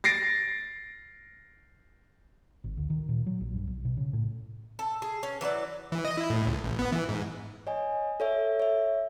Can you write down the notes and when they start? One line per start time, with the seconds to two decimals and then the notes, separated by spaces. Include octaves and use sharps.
0.04 A6 A#6 C7 D7
2.64 G#1
2.77 D2
2.90 D#3
3.09 A#2
3.26 F#3
3.41 A#1
3.55 G2
3.67 B1
3.85 B2
3.97 C#3
4.13 A2
4.79 A4
5.02 G#4
5.23 C#4
5.41 E3 F#3 C5 D5
5.92 E3
6.05 D#5
6.17 E4
6.30 A2
6.47 C#2
6.64 A1
6.79 B3
6.92 E3
7.09 G#2
7.67 C#5 D#5 G#5
8.20 A4 C#5 E5
8.60 C#5 E5